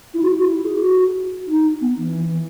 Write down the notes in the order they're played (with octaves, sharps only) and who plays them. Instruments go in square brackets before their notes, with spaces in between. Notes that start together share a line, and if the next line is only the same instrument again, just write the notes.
[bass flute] E4
F#4
F#4
E4
G#4
F#4
D#4
B3
E3